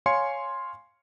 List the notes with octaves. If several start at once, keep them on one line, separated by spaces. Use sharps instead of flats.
C#5 F5 G#5 C6 C#7